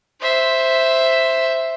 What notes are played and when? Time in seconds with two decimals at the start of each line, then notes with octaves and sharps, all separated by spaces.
0.21 C5 E5